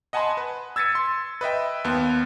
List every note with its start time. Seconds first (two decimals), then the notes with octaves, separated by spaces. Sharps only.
0.13 D#5 F#5 G#5 A5 B5 C6
0.37 B4
0.76 E6 G#6 A6 B6 C#7 D#7
0.95 C6
1.41 B4 D#5 E5 G5
1.84 D#2 B3